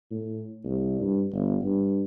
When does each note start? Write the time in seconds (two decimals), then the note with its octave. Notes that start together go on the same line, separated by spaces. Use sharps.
0.11 A2
0.64 C2
1.01 G2
1.33 G1
1.63 G2